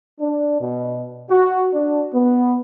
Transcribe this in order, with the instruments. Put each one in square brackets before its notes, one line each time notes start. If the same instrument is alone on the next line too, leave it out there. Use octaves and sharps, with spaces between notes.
[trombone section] D4
B2
F#4
D4
B3